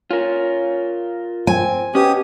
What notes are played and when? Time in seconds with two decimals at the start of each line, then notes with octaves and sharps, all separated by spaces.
0.11 C#4 F4 A#4
1.47 C4 G#5
1.95 B2 C#4 G4 D#6